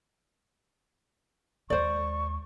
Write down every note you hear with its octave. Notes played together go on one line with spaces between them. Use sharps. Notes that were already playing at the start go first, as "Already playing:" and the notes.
D#2 G#3 C5 D5 C#6